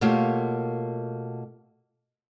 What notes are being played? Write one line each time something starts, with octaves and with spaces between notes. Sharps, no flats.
B2 A3 A#3 F4 G4 C#5